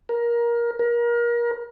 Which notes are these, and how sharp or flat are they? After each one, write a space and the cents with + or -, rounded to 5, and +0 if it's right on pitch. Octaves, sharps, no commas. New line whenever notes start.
A#4 +20
A#4 +30